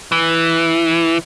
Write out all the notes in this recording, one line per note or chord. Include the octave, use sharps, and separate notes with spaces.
E3